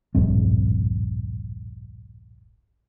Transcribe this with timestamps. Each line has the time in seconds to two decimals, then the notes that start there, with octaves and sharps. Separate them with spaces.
0.15 D1 A#1 G2 C4